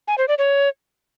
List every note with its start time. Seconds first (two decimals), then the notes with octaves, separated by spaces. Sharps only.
0.08 G#5
0.18 C5
0.28 D5
0.38 C#5